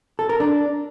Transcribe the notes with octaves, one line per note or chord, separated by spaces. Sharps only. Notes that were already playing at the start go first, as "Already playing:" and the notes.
A4
A#4
D4